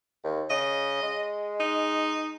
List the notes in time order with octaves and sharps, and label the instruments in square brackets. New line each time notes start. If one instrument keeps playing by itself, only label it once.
[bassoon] D#2
[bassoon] C#3 [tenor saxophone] D#5
[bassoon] G#3
[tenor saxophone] D#4